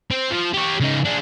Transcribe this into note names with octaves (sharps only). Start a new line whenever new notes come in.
C4
F3
G4 C#5
C#3 D#4
D4 G#4